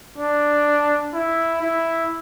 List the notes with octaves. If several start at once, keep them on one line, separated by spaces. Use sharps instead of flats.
D4
E4
E4